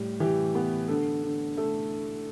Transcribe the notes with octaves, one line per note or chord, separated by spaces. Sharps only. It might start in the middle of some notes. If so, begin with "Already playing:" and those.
Already playing: A2 G3
E3 G4
B3
D3 A4
D3
A3 A4